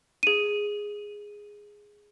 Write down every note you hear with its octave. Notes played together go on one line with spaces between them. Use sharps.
G#4 D#7